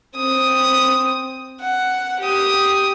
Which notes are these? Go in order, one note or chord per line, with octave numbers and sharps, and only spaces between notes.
C4 D#6
F#5
G4 D#6